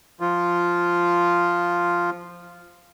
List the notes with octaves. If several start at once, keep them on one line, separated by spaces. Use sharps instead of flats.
F3 F4